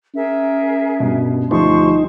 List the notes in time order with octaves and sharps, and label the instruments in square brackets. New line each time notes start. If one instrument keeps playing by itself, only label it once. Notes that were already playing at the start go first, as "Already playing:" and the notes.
[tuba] C#4 [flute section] G#4 A#4 E5
[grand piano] G2 B2
[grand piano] D2 F3 G3 [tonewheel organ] D#4 [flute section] C5 C6 C#6